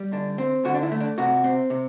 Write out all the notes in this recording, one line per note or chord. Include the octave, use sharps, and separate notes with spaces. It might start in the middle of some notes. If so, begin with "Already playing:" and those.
Already playing: G3
D3 D4
C4
D3 F#4
D4
E4
A3
D4
C3 F#4
C4
C3